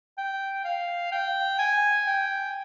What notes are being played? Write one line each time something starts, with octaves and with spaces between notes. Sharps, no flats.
G5
F5
G5
G#5
G5